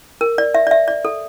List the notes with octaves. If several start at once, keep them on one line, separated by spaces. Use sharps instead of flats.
A#4
D5
E5
D5
E5
D5
A4